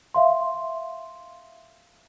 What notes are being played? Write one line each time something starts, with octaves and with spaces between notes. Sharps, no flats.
E5 F5 C6